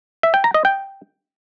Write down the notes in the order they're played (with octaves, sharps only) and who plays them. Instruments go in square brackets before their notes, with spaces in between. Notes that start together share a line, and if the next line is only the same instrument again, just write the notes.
[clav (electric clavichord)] E5
G5
A#5
D#5
G5